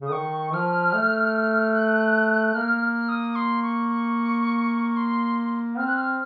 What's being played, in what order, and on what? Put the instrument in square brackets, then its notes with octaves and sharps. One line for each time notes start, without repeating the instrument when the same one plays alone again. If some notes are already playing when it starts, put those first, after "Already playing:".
[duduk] C#3 [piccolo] D#6
[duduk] D#3 [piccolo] C#6
[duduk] F3 [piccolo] F6
[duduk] A3
[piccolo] F#6
[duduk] A#3 [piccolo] F6
[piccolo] F6
D#6
C6
C#6
C#6
C6
[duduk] C4 [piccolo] F6
[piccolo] F#6
F6